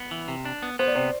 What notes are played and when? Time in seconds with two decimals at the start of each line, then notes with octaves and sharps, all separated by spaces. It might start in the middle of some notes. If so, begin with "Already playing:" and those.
Already playing: B3
0.11 E3
0.28 C3
0.45 D4
0.62 B3
0.79 B3 C5
0.88 D5
0.95 C3 C5